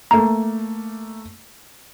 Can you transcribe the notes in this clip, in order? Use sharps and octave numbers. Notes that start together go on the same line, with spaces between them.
A3 A#3 A#5